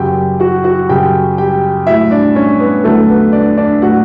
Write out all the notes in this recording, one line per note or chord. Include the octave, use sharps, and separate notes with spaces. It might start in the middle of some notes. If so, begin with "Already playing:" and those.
Already playing: F#2 C#3 F#3 G4 G5
F#4 F#5
F#4 F#5
F#2 C#3 F#3 G4 G5
G4 G5
A2 F#3 E4 E5
D4 D5
C#4 C#5
B3 B4
E2 D3 F#3 A3 A4
B3 B4
D4 D5
D4 D5
A2 F#3 F#4 F#5